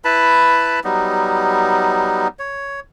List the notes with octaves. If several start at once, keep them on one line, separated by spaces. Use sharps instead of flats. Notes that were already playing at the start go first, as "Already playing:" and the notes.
E4 B4 A5 B5
F#3 G3 B3 D#4
C#5